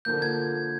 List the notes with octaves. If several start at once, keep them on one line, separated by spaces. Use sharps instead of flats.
D3 F3 A#3 G6
G#6